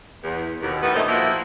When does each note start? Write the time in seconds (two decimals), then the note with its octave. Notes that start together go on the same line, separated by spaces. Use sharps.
0.24 E2
0.61 D#2 B2
0.83 D#3 E3 A3 B3
0.94 G2 A#2 D#3 A3 D#4 C5
1.07 A#2 F3 A#3 E4 F#4 G4